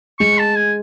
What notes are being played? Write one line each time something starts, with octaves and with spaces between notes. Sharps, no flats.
G#3 C#6
A5
G#5